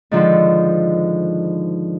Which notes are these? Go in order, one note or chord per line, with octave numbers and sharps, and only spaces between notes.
G#2 D3 D#3 F3